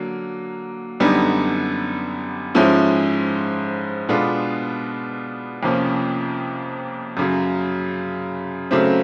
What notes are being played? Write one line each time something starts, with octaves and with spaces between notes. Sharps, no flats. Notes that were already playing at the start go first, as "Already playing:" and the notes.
Already playing: D3 F#3 A#3
F#2 D3 G3 B3 D#4
G#2 F3 G#3 C#4 E4
B2 G#3 B3 D4 F4
F2 C3 F3 A#3 C#4
F#2 C#3 F#3
C#3 F#3 A3 C4